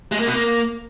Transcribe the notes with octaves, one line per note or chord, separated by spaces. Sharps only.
G#3
A#3
B2
A#3